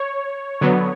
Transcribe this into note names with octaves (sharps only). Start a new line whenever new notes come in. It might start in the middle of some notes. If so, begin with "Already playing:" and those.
Already playing: C#5
D3 F#3 B3